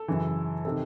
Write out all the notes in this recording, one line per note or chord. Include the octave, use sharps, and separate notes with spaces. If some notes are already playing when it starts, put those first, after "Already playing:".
Already playing: A4
F#2 C#3 E3
C3 D#3 A4